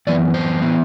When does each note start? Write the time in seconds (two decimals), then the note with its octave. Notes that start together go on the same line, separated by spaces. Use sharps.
0.07 F#2 E3 B3 D5
0.34 C5
0.62 E3 B3